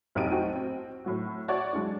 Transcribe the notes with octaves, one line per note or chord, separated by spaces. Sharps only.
F1 B1 D#4 G4 D7 D#7
F#3 A3 C4 D#4 F#4 G4
C4
A2 F#3 F#4
F#4 C#5 D5
F#3 G#3 C#4 D4